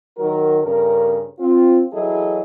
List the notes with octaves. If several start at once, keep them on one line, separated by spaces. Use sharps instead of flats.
D#3 F#3 F#4 A#4
G2 C#3 C#4 A4 A#4
C4 F4
E3 F#3 E4 G#4 A4 D#5